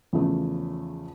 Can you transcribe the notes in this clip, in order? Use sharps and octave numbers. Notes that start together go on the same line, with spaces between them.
E2 C#3 F3 A3